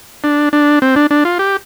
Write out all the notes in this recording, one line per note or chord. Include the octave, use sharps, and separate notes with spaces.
D4
D4
C4
D4
D4
F4
G4